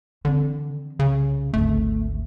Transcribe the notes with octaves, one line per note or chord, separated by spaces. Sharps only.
D3 E3 C4
C2 C#3
G#1 D2 A3